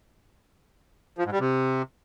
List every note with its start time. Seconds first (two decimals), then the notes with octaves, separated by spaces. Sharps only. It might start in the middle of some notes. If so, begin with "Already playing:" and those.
1.18 F3
1.25 G#2
1.32 G3
1.39 C3